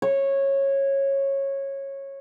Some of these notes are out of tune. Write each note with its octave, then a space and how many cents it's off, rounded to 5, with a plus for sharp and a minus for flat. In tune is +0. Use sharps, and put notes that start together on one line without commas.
C#5 -15